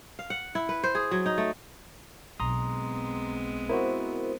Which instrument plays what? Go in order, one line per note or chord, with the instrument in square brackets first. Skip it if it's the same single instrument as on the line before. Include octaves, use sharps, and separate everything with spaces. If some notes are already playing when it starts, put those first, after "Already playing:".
[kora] F5
F#5
E4
B4
C5
G#4
F#3
D#4
A3
[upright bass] B1 [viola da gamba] G#3 B3 C4 [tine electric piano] A#5 C6 D#6
[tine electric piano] E4 F#4 [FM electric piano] A#4 C5